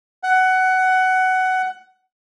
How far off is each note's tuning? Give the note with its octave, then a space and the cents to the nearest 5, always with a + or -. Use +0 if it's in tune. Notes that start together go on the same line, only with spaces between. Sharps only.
F#5 +15